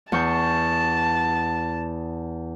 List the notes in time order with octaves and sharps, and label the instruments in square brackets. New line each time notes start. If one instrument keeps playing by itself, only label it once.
[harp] E2 C#6 G6 [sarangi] A5